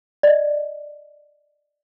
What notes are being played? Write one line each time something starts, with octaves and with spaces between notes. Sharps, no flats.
D5 D#5